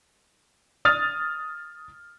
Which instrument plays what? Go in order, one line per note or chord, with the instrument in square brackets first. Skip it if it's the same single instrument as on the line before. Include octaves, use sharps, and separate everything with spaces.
[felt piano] D#6 F6 A6